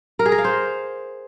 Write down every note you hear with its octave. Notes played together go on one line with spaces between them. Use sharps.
A#4
G#4
A#4
F5
C5